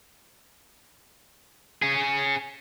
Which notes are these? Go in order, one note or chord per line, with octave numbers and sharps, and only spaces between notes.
C#4 G#4